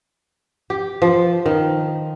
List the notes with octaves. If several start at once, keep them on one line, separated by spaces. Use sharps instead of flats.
G4
F3
D#3